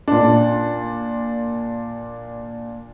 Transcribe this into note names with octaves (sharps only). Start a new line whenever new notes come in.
A#2 D4